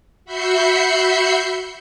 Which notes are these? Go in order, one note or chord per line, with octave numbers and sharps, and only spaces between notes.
F#4 E5 B5 G6 C7 C#7